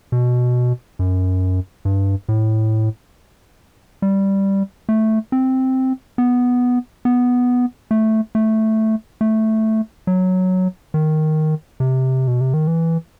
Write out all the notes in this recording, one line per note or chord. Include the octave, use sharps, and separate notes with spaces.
B2
F#2
G2
A2
G3
A3
C4
B3
B3
A3
A3
A3
F#3
D#3
C3
B2
C3
D#3
E3